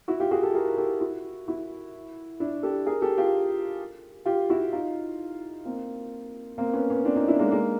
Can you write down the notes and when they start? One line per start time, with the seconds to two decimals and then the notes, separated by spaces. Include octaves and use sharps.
0.08 E4 F#4
0.20 F4 G4
0.31 F#4 G#4
0.43 G4 A4
0.55 G#4 A#4
0.69 A#4
0.77 G4 A4
1.00 E4 F#4
1.48 E4 F#4
2.40 D4 E4
2.63 G4 A4
2.86 G#4 A#4
3.02 G4 A4
3.18 F4 G4
4.26 F4 G4
4.50 E4 F#4
4.73 D#4 F4
5.65 A#3 C4
6.58 A#3 C4
6.73 B3 C#4
6.90 B3 C#4
7.05 C4 D4
7.16 C#4 D#4
7.28 D4 E4
7.39 G#3 A#3
7.51 G#3 A#3